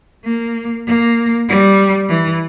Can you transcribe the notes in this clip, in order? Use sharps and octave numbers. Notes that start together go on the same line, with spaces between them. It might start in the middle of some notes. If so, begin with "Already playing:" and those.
A#3
A#3
G3
E3